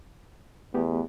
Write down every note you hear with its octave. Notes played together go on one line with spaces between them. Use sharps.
E2 A3 B3 G4